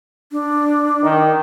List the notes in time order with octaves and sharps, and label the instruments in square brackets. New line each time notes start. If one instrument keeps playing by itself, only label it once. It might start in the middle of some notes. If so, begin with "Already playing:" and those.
[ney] D4
[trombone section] D#3